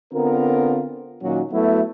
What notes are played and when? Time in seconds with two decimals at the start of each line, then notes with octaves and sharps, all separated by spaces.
0.13 D3 B3 C4 F4 A#4
1.23 A#2 D#3 F#3 A#3 C#4 F#4
1.52 F#3 A3 B3 E4 F#4